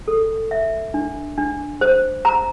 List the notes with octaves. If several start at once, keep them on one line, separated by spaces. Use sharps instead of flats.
A4
E5
D4
D4
C5
A#5